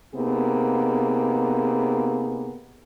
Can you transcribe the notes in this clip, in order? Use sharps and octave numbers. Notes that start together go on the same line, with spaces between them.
C3 A#3 B3 D#4 G#4